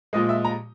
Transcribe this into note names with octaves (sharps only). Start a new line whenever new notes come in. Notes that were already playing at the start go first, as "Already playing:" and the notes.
A#2 F3 G#3 D#5
E5
A#5